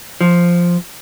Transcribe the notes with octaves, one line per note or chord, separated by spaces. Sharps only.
F3